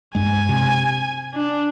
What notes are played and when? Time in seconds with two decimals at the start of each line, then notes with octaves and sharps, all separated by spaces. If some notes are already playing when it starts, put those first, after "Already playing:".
0.15 G2 G#3 G#5
0.49 C3
1.34 D4